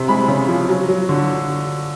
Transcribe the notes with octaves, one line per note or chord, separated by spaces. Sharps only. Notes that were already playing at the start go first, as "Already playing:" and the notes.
Already playing: C3
G#3 B5
C#3
F3
F#3
F#3
D3